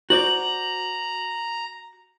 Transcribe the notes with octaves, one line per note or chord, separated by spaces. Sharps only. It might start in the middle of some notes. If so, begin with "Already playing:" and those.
F#4 C5 D5 A#5 F#7